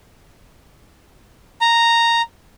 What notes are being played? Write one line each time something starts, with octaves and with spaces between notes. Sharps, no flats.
A#5